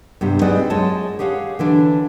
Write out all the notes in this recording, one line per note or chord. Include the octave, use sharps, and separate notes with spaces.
G2 C3 B3
G#3 C4 D#4 B4 D5 F#5
F#2 G#3 C#5 A5
G4 G#4 C#5 F5 F#5
D3 E3 D4